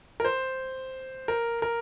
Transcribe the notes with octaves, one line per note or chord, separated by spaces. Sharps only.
A#4
C5
A#4
A#4